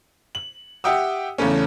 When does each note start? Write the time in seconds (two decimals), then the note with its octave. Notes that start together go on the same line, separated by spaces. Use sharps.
0.35 F#7
0.84 G4 E5 F#5 G5 D#6 E6
1.38 E2 C#3 A3 C#4